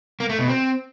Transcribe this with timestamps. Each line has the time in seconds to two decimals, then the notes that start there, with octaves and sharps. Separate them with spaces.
0.20 A#3
0.29 A3
0.39 B2
0.48 C4